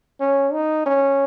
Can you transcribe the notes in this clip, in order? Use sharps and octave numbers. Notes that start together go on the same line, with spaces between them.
C#4
D#4
C#4